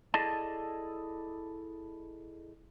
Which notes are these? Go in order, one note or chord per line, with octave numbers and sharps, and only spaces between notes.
E4 G#4 A4 D5 D#5 A5